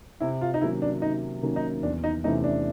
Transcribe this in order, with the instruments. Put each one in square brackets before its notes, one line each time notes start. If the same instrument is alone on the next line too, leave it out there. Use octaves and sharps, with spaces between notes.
[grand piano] C3 [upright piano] E4
[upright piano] F4
D#4
[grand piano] D#3 F#3 A#3 C#4 [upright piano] E4
[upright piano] D4
[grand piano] C3 [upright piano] D#4
[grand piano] D#3 F#3 A#3 C#4
[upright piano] D#4
[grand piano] E2 [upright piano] D4
[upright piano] D#4
[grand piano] C3 E3 A3 C#4 [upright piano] D#4
[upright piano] D4